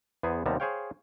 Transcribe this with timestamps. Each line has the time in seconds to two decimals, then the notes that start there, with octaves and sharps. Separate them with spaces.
0.23 E2 B3 G#4 C5 G#5
0.46 D#2 C3 G3 B3 A5 A#5
0.60 G#4 C5 C#5 F5 G5